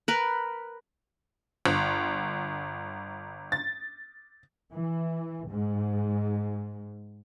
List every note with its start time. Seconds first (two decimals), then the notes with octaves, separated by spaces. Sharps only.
0.08 A#4 B4
1.66 G1
3.52 A6
4.71 E3
5.48 G#2